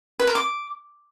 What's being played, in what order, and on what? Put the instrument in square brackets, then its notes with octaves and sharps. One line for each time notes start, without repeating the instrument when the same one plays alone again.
[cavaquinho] B4
A#4
D6